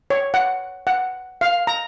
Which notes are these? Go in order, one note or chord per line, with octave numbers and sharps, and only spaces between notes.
C#5
F#5
F#5
F5
A#5